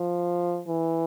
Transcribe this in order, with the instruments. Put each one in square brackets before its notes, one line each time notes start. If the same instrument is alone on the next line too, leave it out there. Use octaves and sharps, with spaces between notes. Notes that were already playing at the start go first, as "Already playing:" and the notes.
Already playing: [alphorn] F3
E3